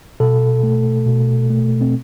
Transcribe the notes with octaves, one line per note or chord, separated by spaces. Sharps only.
B2 A4
A3
B2
A3
C4